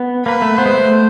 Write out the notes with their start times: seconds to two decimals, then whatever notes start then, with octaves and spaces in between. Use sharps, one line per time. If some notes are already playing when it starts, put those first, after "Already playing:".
Already playing: B3
0.25 A#3 B4
0.42 A3
0.58 B3 C5
0.66 G#3
0.74 A3